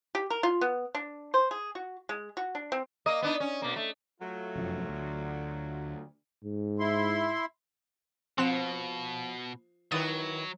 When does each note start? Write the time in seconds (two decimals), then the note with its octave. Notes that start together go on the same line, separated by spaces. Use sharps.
0.15 G4
0.30 A#4
0.43 F4
0.61 B3
0.95 D4
1.34 C5
1.51 G#4
1.75 F#4
2.09 G#3
2.37 F#4
2.55 D4
2.72 C4
3.06 A#3 D#5
3.22 B3 D4 D#4
3.40 C#4
3.62 B2 A#3
3.76 A3
4.21 F#3 A3 F4
4.55 F1 F#2 F3
4.89 D2
6.44 G#2
6.79 E4 C6
8.38 B2 F3 C4 F#6 E7
9.92 D#3 F#3 E4 B4 D#6 A6 D#7